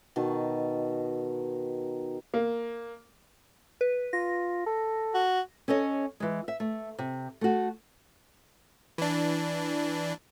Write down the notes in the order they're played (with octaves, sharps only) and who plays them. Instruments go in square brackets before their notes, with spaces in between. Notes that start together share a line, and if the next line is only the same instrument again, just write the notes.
[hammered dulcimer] B2 D#3 A5
[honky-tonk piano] A#3
[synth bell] B4
[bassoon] F4 [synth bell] A#6
[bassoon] A4
[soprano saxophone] F#4
[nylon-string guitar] C#4 A4 C#5 D#5
E3 G#3
E5
A3
C3
A3 F#4
[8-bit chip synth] E3 D4